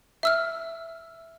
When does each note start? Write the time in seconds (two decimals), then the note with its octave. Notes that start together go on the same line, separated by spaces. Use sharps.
0.23 E5 E6 F6